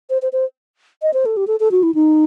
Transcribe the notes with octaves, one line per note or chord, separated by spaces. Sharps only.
C5
C5
C5
D#5
C5
A4
G4
A4
A4
F#4
E4
D#4